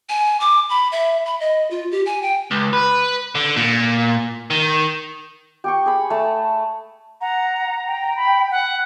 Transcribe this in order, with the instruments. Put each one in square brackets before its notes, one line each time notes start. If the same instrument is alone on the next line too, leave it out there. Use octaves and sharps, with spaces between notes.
[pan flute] G#5
D6
B5
E5
B5
D#5
F4
G4
G#5
G5
[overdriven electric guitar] C#2
B4
D3
A#2
D#3
[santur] G4 G5 C#6
G#4 B5
A3 A5
[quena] F#5 [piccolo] A#5
[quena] G5
[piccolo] B5
F#5